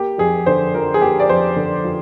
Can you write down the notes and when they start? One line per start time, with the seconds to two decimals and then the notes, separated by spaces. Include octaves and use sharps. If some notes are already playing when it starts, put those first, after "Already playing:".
Already playing: A#3 G4
0.18 F2 G#4
0.46 D3 C5
0.74 F3 A#4
0.94 G#4
1.01 A#3 G4
1.20 D5
1.29 F2 C5
1.56 D3
1.84 F3